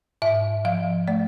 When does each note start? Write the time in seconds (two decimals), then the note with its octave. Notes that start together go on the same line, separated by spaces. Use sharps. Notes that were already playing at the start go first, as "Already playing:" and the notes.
0.22 G#2 E5
0.65 F3 F5
1.08 A3 D5